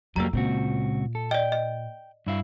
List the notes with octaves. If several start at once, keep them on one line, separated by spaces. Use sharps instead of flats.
F2 F#3 G3 A#3 A#5 E6
C#2 A#2 C4 F#4
A4
D5 D#5 G5
D#5
G2 E4 F5